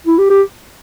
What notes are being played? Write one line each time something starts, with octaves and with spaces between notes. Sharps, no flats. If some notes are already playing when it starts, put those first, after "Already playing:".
E4
G4
G4